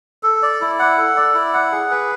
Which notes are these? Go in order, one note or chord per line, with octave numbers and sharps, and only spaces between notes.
A4
D5
E4
F#5
A4
D5
E4
F#5
G#4
B4